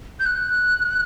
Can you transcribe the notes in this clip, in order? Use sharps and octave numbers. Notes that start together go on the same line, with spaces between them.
G6
F#6